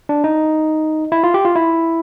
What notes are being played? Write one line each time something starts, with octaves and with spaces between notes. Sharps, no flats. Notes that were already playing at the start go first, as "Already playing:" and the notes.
D4
D#4
E4
F4
G4
F4
E4